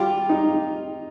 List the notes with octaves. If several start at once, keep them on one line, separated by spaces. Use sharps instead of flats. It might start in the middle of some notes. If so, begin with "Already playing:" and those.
Already playing: G3 F4 G4
D#4